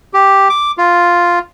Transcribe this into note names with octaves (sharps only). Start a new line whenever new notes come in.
G4
D6
F4